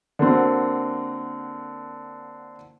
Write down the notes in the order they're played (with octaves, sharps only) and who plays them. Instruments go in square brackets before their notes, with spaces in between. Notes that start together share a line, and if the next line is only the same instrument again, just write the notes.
[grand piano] D3 A#3 C4 F#4